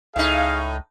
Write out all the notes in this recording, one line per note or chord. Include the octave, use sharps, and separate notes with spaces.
C#2 A2 D#4 G#4 F5